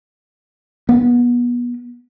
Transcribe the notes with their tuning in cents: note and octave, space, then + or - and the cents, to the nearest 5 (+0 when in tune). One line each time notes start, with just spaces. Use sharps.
B3 -30